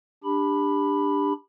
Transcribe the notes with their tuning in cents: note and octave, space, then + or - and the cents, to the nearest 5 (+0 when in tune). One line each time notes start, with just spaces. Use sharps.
D4 +0 G4 +20 B5 +0